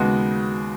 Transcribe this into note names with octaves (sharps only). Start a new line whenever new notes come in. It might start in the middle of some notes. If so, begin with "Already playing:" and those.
Already playing: D#2 C#3 G#3 B3 F#4